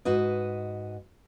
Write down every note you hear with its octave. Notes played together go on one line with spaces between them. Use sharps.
G#2 F#4 B4 D#5